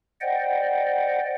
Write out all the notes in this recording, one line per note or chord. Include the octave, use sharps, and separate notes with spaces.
C5 D5 D#5 F#5 G5